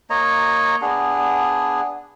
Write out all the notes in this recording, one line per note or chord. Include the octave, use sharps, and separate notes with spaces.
A#3 C#5 D#5 A#5
B3 D4 G#4